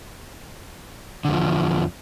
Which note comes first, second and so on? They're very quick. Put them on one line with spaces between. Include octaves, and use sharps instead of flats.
D3 E2 F3